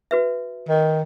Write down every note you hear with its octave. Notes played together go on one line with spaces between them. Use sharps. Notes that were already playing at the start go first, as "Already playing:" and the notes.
F#4 B4 E5
D#3